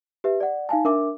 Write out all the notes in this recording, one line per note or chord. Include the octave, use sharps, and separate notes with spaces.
G4 B4 E5
D5 F#5
D#4 F5 G#5 A5
D4 A#4 E5 D6